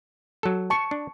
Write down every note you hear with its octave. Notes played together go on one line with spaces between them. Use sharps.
F#3 A4
A5 C#6
D4